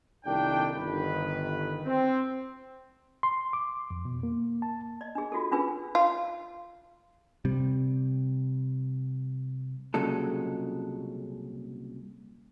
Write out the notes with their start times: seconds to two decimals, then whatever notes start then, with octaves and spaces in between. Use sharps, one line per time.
0.25 C2 A#2 D#3 A3 D4 G5
0.76 G1 D#3 B4
1.85 C4
3.23 C6
3.53 D6
3.90 F2
4.05 B2
4.23 A#3
4.62 A5
5.01 D5 D#5
5.15 D4 G#4
5.32 F4 F#4 G#4 A4
5.52 C#4 D4 F4 G#4 B4
5.95 F4
7.45 C3 G3
9.94 C2 A#2 C#3 F#3 G#3 A4